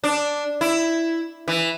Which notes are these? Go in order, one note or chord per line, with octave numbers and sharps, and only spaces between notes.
D4
E4
E3